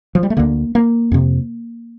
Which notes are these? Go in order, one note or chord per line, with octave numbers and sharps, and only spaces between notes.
F3
G3
A3
D2 D3 A#3
A#3
F2 C3